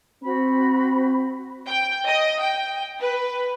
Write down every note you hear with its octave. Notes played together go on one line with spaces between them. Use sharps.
C4 F#4 C5 B5
G5
D#5
G5
B4